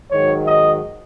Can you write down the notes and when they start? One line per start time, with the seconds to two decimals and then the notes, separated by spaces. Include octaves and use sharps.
0.11 G#2 D#3 F#3 C#5
0.47 D#5